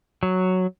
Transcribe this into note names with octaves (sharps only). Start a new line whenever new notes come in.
F#3